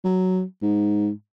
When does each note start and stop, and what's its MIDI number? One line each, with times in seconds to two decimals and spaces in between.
0.04 0.42 54
0.62 1.09 44